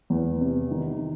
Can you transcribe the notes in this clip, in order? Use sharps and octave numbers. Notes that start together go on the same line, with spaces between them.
E2
C3
D#3